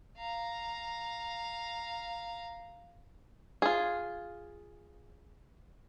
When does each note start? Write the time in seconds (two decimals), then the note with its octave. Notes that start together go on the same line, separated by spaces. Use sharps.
0.17 F5 A#5
3.62 F4 G#4